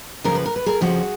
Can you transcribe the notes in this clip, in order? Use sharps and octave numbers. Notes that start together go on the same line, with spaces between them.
F2 C#3 F3 A#4
B4
A#4
B4
G#4 A#4
F2 C#3 F3 F#4 G#4